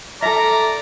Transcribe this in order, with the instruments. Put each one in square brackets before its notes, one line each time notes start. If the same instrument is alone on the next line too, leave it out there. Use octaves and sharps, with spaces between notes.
[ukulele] A4 E5 [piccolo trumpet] D5 [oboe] A#5